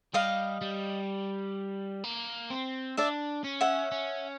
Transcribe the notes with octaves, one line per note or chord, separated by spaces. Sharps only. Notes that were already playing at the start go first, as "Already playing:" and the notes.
G3 D#5 F5
G3
A#3
C4
D4 D5 E5
C#4
E5 F#5
C#4